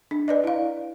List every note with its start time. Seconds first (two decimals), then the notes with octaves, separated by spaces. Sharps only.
0.11 D4
0.28 B4 D5 D#5
0.44 E4 F5